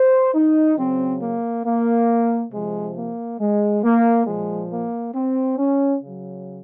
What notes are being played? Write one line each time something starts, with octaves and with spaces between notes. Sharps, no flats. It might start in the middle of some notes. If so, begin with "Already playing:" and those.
Already playing: C5
D#4
C#3 F#3 C4
A#3
A#3
C3 F3 G#3
A#3
G#3
A#3
A#2 F3 G#3
A#3
C4
C#4
C#3 F#3